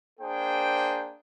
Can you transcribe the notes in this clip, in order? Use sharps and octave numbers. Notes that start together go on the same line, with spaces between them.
A#3 D4 G#4 C5 G5